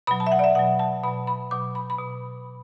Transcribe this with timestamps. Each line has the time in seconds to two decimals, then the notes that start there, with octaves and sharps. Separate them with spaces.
0.07 B2 F#3 B5
0.20 A5
0.27 E5
0.32 F#5
0.39 D5
0.44 E5
0.55 B2 F#3 F#5
0.79 A5
1.03 B2 F#3 B5
1.27 B5
1.51 B2 F#3 D6
1.75 B5
1.90 B5
1.99 B2